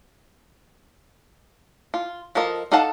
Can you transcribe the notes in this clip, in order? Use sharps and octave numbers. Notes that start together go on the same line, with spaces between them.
F4
F3 F4 A4 A#4 D#5
D#4 A4 F5 F#5 A5